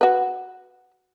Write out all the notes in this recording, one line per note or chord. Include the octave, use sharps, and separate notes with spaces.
F#4 B4